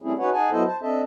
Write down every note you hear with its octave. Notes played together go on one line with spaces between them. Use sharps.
G3 A3 C4 C#4 E4 G#4
C#4 D#4 F#4 B4 C#5 F#5
D#4 G#4 F#5 G#5 A5
F#3 B3 E4 A4 C5 D#5
C5 A5
C4 D4 A4 D#5 E5 A5